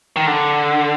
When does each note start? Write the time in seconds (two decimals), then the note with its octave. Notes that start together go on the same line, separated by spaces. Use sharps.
0.16 D#3
0.27 D3